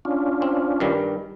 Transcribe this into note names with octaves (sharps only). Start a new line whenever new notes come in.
C#4 D4 F4
C4
G2 D#3 G3